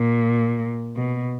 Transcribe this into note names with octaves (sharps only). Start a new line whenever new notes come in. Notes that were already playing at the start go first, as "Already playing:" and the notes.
Already playing: A#2
B2